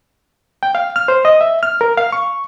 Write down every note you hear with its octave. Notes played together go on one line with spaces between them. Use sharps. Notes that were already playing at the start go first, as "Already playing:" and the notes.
G5
F5
F6
C5
D#5
E5
F6
A#4
F5
C#6